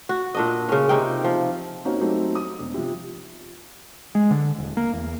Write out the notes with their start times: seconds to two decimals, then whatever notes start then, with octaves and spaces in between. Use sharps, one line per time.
0.09 F#4
0.35 A#2 D4 D#5
0.68 C#3 C#4
0.89 C3 D#4 G5
1.24 F3
1.85 A#3 C4 C#4 D#4 F#4
2.01 F#3 A3 C4 D#4 G4
2.35 D#6
2.59 E1
2.74 C3 F3
4.15 G#3
4.31 D3
4.58 D#1
4.77 A#3
4.93 E2